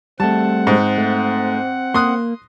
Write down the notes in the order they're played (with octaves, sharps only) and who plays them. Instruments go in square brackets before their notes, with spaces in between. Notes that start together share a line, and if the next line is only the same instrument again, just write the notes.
[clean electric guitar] G3 A3 [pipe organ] C4 F#5 [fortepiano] A5
[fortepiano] G#2
[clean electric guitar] A3
[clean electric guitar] A#3 [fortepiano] C6 D#6 F#6